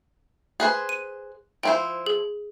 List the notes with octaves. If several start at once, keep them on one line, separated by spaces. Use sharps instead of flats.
G#4 B4 C5
D#7
F3 E4 C5 G5
G#4